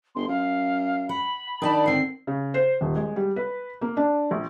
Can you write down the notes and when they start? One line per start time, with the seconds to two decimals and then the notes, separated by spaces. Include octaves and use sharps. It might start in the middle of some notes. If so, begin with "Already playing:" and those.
0.15 G1 C6
0.28 F#2 F5
1.09 F#5 B5
1.62 D#3 D4 D5 A5
1.86 D3 C4 F#5 C7
2.27 C#3
2.54 C5
2.81 D#1
2.96 G#3
3.16 G3
3.36 B4
3.81 A#3
3.97 D4
4.31 A#1